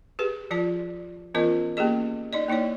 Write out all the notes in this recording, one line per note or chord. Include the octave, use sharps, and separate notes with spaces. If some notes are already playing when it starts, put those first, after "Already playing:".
G4 G#4 B4
F3 F4 D5 A5
E3 B3 C#4 F4 A#4 D#5
A#3 C#4 G4 G#4 D#5
D#4 D5 D#5
A#3 D#4 E4 C#5 D5